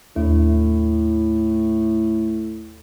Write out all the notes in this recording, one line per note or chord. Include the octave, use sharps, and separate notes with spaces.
D#2 A2